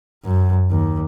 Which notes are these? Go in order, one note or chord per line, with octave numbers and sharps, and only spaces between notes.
F#2
D#2